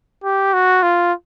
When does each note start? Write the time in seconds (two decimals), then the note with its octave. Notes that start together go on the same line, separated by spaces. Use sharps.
0.24 G4
0.54 F#4
0.82 F4